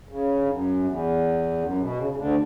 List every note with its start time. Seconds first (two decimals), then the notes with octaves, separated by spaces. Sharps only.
0.09 C#3
0.40 G2
0.47 F#2
0.84 E2
1.59 F#2
1.78 B2
1.97 C#3
2.09 C#3
2.16 D2 D3